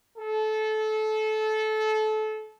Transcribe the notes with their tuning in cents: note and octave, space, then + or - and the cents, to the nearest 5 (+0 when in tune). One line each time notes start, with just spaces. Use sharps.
A4 -25